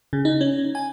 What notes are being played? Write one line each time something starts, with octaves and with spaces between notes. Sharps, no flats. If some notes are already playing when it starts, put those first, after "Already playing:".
C#3
D#4
C#4
G#5